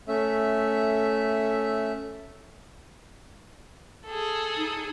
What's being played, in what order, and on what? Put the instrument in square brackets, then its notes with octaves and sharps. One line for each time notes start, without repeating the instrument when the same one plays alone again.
[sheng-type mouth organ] A3 C#4 E5
[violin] G#4 A4
[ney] D#4